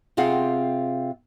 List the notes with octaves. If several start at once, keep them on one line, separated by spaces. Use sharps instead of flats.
C3 C4 F4 G#4 F5 F#5